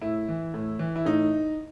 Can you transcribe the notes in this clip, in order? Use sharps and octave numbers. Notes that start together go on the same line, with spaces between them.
A2 E4
E3
A2
E3
E4
A2 D#4